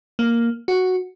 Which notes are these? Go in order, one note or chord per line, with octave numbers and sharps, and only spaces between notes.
A#3
F#4